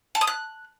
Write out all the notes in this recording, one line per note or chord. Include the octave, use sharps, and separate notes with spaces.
A5
D#6
F#6